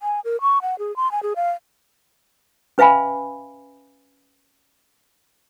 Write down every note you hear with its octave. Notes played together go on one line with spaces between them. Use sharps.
G#5
A#4
C#6
F#5
G#4
C6
G#5
G#4
F5
C#4 B4 E5 F5 G#5 B5